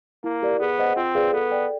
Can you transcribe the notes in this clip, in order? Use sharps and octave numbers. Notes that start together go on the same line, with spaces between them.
A#3 E4
G4 A#4 D5
B3 G#4
C5 D#5 F#5
C4 F4
G#4 B4 D5 F5
B3 A4
D5 G5